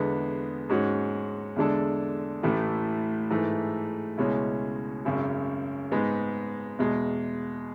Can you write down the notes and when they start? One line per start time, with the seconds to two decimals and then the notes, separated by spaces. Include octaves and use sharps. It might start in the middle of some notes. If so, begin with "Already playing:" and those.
Already playing: E2 D3 G#3 B3
0.69 G#2 G#3 C#4 F#4
1.56 E2 D3 G#3 D4 A4
2.43 A1 A2 E3 A3
3.30 G#2 E3 A3
4.18 C#2 B2 G#3 C#4 E4
5.05 G#1 F#2 C#3
5.91 G#2 G#3 B3
6.79 E2 B2 G#3